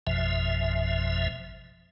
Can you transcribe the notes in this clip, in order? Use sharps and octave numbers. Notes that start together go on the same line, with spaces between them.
G#1 F2 B2 F3 E5